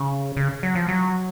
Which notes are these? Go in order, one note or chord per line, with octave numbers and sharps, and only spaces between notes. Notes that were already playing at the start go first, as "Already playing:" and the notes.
Already playing: C#3
C#3
F#3
F3
F#3